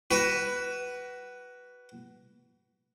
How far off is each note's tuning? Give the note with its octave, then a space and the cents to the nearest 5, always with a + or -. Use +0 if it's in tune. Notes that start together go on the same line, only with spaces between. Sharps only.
F#4 +30 B4 +0